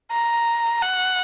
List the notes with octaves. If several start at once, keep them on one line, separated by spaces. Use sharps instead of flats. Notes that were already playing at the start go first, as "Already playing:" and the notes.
A#5
F#5